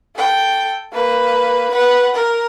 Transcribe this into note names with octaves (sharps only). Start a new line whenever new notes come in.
A4 G5
A#3 B4
B4 F#5
A#4